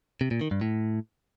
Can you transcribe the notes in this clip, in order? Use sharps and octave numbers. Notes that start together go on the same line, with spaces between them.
C3
A#2
D#3
G2
A2